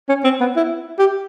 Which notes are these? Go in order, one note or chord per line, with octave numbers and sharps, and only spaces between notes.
C#4
C4
B3
E4
G4